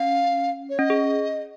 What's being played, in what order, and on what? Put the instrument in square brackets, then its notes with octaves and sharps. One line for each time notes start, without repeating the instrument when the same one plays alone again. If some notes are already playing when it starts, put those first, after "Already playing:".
Already playing: [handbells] C#4 [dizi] F5
[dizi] C#5
[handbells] C#4 [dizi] D#5
[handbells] G#4